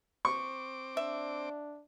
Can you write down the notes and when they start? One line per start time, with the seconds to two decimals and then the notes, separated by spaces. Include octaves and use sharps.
0.25 C4 C#6 D6
0.97 D4 E5